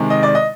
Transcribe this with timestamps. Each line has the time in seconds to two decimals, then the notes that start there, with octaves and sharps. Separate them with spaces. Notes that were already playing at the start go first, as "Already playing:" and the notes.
Already playing: C3 D#3 G#3
0.10 D#5
0.23 D5
0.35 D#5